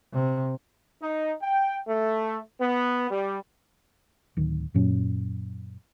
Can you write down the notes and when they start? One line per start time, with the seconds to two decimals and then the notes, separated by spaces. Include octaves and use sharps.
0.13 C3
1.02 D#4
1.42 G5
1.87 A3
2.60 B3
3.10 G3
4.37 D1 D#3
4.74 F#2 A#2 F#3 C#4